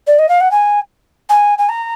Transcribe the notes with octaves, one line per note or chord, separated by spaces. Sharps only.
D5
D#5
F5
F#5
G#5
G#5
G#5
A#5